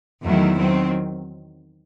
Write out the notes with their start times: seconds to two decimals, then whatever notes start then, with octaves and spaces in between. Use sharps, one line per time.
0.24 E2 D#3 F#3 A3 E4
0.58 D#3 F#3 C4